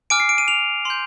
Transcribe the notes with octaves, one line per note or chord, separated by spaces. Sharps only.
G#5 D6 F6 D7
C7
D7
D#7
F7
C6 G6